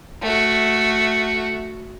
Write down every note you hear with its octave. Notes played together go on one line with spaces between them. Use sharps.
A3 F#4